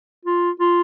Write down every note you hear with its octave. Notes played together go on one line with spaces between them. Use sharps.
F4
F4